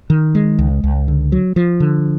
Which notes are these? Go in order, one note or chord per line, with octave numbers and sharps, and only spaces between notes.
D#3
G#3
C#2
C#2
D3
F#3
F3
D3